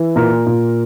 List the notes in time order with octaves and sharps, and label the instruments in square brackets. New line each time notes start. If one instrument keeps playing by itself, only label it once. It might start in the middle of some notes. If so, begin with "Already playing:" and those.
Already playing: [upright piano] E3
A#2 A#4
A#2